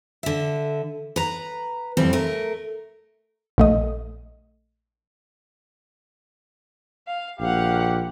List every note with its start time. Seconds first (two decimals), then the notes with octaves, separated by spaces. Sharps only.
0.23 D3 E5
1.16 B4 A#5
1.97 F2 A2 E3 G3 C4
2.13 A3 A#4
3.58 A#1 A3 D#5
7.06 F5
7.40 A#1 G4 F5 F#5